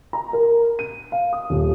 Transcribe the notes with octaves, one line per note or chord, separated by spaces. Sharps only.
A#5
A#4
D#7
F5
D#6
D#1